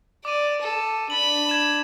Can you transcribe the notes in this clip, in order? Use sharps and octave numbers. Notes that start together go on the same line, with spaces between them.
D5 D6 D#7
A4
D4 B5 F#7
G#6 E7